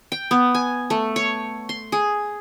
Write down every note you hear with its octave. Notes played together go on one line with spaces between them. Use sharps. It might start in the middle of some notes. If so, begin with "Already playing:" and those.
G5
B3
G#5
A3
C#5
C6
G#4